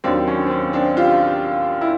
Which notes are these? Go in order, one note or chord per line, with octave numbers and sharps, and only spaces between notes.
D#2 D#3 F#3 C4 D4
C#4
C4
C#4
C4 D4
F4 G4
E4